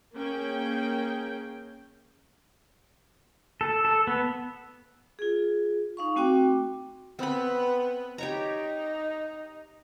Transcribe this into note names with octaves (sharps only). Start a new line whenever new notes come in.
A#3 C#4 G#4 G5
A4
A4
B3
F4 G#4
D#4 F5 C#6
A3 C4 F#4 G5 D6
B3 C4 B4 B5
D#4 G4 C#5 A#5